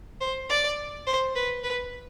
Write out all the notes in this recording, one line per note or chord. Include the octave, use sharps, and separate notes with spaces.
C5
D5
C5
B4
B4